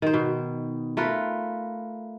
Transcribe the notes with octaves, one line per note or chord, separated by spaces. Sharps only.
D#3 C5
B2
A3 F4 A#4 B4